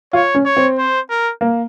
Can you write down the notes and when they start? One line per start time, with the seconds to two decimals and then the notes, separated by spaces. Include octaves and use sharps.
0.13 F4 C#5
0.35 C#4
0.45 C#5
0.57 C4
0.78 C5
1.10 A#4
1.41 A#3